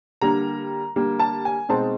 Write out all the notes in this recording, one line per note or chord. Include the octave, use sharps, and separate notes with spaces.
D3 G3 A#3 A#5
D3 G3 A#3
A5
G#5
B2 G#3 C4 D#4 A5